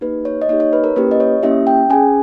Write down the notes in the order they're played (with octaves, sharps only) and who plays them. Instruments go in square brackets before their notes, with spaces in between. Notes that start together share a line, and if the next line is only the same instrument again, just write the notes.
[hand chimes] A#3 D#4 G4 B4
C#5
D#5
A#3 D#4 G4 C#5
C#5
B4
A#4
A#3 C#4 E4 G4 B4
D#5
C#5
A#3 C#4 E4 G4 E5
G5
C#4 G#4 G#5